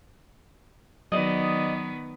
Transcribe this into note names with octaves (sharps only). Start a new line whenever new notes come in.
D#3 F#3 B3 D5 D#5